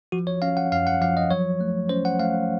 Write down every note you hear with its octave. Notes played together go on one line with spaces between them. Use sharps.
F3 F#4
C#5
C#4 F5
F#5
F#2 F5
F#5
F3 F5
D#5
F#3 C#5
A3
C#4 C5
F#5
A3 F5